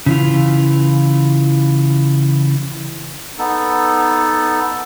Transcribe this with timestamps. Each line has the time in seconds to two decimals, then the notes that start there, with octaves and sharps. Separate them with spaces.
0.06 C#3 E3 F4
3.39 B3 D#4 A4